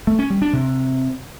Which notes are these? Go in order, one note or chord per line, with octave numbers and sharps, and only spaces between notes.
A3
C#4
G3
D4
C3